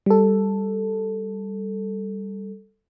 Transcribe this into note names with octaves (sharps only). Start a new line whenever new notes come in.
G3 A4